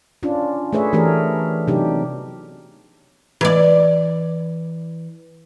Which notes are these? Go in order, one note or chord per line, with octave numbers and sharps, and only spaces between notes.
C#4 D4 F4
A3 G#4 B4 C#5 E5
E3 A3 D4 G4 G#4 A#4
C3 F#3 B3 D4 D#4 G4
E3 D5